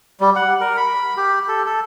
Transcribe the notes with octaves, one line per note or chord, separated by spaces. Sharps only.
G3
F#5
A#4
B5
G4
A4
A4